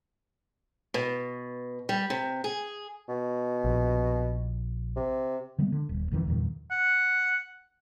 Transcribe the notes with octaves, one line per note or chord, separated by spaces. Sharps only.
B2
G3
C3
G#4
B2
A#1
C3
D3 G3 G#3 B3
D3
D#1
B1 F2 D#3 E3
E2 G2 A#2 D#3
F#5